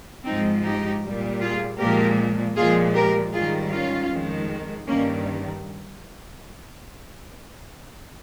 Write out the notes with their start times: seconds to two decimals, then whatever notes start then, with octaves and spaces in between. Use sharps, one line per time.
0.25 G#2 F3 G#3 C4 D#4
0.64 D#4 G4
1.02 A#2 G3
1.41 F4 G#4
1.78 A#2 F3 G#3 G4 A#4
2.55 A#2 F3 G#3 F4 G#4
2.94 G4 A#4
3.32 G#2 D#3 G3 F4 G#4
3.71 C#4 F4
4.09 F2 D#3 G#3
4.86 G2 D#3 G3 A#3 C#4